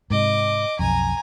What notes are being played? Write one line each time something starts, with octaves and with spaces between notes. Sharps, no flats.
G#2 C3 D#5 D6
B1 F2 G#5 A#5